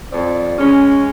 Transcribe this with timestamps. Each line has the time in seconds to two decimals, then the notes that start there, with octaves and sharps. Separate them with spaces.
0.12 F2 C4 D5
0.58 G#3 C#4